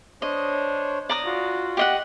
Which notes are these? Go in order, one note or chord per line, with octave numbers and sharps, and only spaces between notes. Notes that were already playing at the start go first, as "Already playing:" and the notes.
D4 C5 C#5 D#5
D5 A#5 D#6
F4 F#4
G4 D#5 F#5